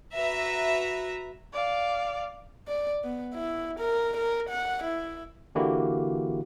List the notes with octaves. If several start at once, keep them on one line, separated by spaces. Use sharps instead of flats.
F#4 B4 E5 A#5
D5 F5
D5
B3
E4
A#4
A#4
F#5
E4
D3 E3 A#3 E4 F#4 G4